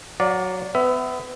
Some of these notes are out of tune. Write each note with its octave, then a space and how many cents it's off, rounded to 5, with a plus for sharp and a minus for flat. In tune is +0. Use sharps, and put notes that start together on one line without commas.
F#3 +0 D5 -10 F5 +40
B3 +30 E5 +0